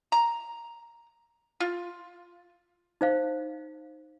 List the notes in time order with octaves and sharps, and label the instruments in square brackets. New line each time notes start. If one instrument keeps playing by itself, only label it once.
[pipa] A#5
F4
[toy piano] D#4 C5 F5